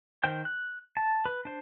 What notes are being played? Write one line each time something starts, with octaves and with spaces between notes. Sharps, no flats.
D#3 A#4 C5 G5 G6
F#6
A5
B4
D4 C5